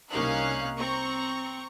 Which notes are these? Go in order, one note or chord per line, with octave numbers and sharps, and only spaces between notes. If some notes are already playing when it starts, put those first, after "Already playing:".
C2 A#3 C#4 D#4 F5 F#6
C4 A#5 C#6